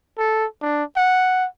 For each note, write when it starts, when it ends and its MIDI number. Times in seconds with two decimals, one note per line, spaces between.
0.18 0.46 69
0.62 0.84 62
0.97 1.47 78